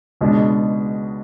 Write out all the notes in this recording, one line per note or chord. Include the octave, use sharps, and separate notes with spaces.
C#2 B2 G#3 D4